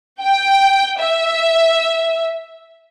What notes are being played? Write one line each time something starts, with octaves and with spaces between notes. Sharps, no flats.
G5
E5